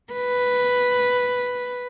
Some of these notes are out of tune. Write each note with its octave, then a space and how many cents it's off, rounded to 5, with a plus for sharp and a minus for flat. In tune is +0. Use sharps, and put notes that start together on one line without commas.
B4 +0